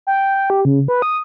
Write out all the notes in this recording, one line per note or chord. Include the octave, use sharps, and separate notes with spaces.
G5
G5
G4
C#3
B4
D#6